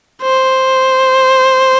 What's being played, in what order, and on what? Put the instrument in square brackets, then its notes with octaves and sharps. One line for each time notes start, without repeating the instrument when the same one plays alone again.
[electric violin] C5